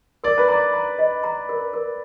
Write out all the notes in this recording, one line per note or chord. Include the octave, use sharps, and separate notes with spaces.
A#4 D5
B4
D5 A#5
A#5
D#5
A#5
A#4
A#4